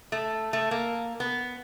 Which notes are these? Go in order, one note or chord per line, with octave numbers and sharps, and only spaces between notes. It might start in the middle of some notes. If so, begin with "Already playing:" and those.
A3
A3
A#3
B3